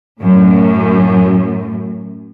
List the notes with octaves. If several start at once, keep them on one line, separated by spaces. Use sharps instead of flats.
F#2 A2